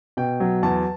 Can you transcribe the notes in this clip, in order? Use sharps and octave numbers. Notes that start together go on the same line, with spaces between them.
B2 G5
F#3
E2 A5